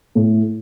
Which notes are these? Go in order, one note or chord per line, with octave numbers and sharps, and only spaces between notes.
A2